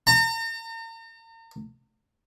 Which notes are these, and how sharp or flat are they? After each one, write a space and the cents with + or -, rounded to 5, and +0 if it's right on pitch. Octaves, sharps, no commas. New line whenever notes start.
A#5 -40